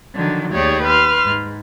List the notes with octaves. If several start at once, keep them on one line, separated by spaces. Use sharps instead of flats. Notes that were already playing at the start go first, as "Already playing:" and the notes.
D3 D#3 F3 F#3 D4
D#2 A3 G4 G#4 C#5 D5
B4 C6 F6
G#2